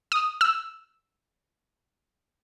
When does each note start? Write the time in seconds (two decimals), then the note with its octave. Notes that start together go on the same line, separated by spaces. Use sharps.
0.12 D#6
0.41 E6